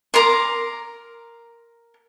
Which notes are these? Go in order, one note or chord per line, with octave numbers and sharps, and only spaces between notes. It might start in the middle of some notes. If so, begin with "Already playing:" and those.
A#4 A#5 C6 D6